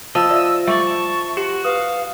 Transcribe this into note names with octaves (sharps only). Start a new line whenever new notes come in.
F3 D#5 A5 E6
D5 E5
G3 A3 D5 E5 C#6
A5
F#4 G4
B4 F5 D#6